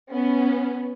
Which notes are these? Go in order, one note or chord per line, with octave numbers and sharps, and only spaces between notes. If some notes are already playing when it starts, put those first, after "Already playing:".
B3 C#4